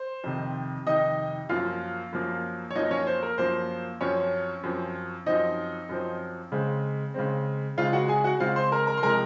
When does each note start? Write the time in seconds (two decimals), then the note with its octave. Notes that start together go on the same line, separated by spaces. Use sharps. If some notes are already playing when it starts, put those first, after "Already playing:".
Already playing: C5
0.24 F2 C3 D#3
0.87 F2 C3 D#3 D#4 D#5
1.49 F#2 F3 A#3 F4 F5
2.13 F#2 F3 A#3
2.71 C#5
2.75 F#2 F3 A#3 D#4 D#5
2.91 C#4 C#5
3.07 C5
3.23 A#4
3.38 F#2 F3 A#3 C5
4.01 F#2 F3 C4 C#4 C#5
4.63 F#2 F3 C4
5.26 F#2 F3 C4 D#4 D#5
5.89 F#2 F3 C4
6.52 C#3 G#3 C4
7.14 C#3 G#3 C4
7.77 C#3 G#3 C4 F4 F5
7.93 F#4 F#5
8.08 G#4 G#5
8.24 F#4 F#5
8.40 C#3 G#3 C4 F4 F5
8.56 C5 C6
8.72 A#4 A#5
8.87 A#4 A#5
8.97 C6
9.03 C3 F3 G#3 A#4 A#5